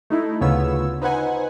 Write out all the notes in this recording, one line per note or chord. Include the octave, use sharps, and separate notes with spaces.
A3 D#4 E4
D2 C#3 B3 F4 C#5 E6
D#4 B4 C5 F#5 G#5